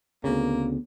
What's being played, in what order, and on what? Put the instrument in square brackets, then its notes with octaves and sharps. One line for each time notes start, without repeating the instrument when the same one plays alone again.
[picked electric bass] D2 C#3 [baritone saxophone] A#3 [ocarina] B3